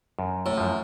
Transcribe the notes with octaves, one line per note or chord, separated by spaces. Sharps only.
F#2
A2
F#2 F3